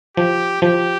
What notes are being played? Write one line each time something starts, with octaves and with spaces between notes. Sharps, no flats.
F3 G4
F3 G4